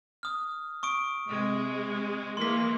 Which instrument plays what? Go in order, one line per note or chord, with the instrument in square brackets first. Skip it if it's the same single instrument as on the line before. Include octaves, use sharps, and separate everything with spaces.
[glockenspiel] D#6 F6
C#6 D#6 D7
[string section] C3 G#3
[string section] E3 G#3 A#3 [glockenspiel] C6 B6